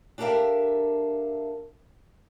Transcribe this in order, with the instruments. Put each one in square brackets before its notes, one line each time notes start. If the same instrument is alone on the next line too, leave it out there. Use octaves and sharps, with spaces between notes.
[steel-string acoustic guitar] D4 G4 A4 A#4 E5 F5